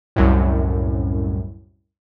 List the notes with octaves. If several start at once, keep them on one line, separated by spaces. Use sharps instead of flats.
C2 F#2 A2